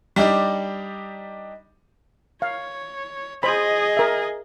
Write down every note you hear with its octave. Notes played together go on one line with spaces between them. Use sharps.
G3 D4 D#4 G4
C#5 F5
G#4 C5 D#5 B5
A#4 E5